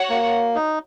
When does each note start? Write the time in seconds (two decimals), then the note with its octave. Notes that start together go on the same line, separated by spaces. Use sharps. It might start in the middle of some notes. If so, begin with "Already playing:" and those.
Already playing: F#4 C#5 F#5
0.10 A#3
0.55 D#4